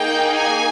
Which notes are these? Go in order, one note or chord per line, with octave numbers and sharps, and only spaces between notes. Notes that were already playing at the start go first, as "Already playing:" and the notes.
Already playing: A#3 D#4 G#4 G5
G#5